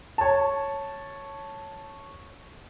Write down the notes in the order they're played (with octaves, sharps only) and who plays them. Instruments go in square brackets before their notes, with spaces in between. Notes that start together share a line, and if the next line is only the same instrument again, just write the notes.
[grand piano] C#5 A5